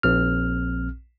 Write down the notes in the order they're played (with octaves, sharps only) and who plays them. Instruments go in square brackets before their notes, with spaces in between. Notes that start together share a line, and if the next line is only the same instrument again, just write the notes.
[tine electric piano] A#1 C4 F6